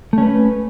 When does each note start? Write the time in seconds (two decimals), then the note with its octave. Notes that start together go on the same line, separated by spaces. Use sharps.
0.13 A3
0.18 C#4
0.23 B4